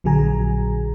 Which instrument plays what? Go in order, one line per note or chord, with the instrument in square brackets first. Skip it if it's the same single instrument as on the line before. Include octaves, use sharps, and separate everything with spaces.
[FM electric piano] A#1 D3 F#3 G#4 G#5 A#5